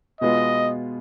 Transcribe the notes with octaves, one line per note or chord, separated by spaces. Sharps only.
B2 G#3 B3 F4 D#5